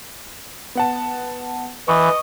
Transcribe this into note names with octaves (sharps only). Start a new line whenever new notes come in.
B3 F#5 A5
E3 D#5 C#6